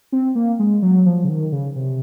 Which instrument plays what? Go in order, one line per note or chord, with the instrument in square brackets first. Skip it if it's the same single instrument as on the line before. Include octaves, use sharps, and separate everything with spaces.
[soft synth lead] C4
A#3
G#3
F#3
F3
C#3
D#3
C#3
C3